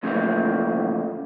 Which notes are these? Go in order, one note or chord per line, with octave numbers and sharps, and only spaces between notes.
A2 C#3 E3 F3 A3 A#3